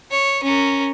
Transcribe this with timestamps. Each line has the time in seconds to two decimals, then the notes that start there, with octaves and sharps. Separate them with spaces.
0.11 C#5
0.43 C#4 A#4